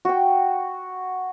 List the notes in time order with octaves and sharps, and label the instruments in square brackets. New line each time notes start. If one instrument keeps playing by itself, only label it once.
[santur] F#4 G5